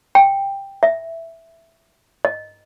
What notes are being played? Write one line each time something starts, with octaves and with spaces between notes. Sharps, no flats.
G5
E5
D#5